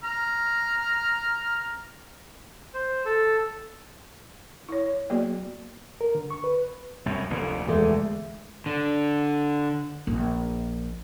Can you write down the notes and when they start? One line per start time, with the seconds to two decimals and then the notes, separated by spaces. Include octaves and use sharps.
0.04 A#5 F6
2.74 C5
3.06 A4
4.69 E4 C#5
4.86 C#5
5.10 F#3 A#3 B3 F#4 G#4 D5
6.01 A#4
6.15 D3
6.30 C#6
6.44 B4
7.06 C2 F#2
7.30 F1 D2 A#2
7.68 E2 G#3 A3
8.66 D3
10.07 A#1